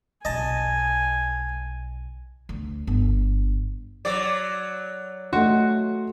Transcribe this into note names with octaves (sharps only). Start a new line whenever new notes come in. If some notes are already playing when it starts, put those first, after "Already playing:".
B1 C3 D#5 G#5 A5
D2
G1
F#3 D5
A3 F#4 D#5 C6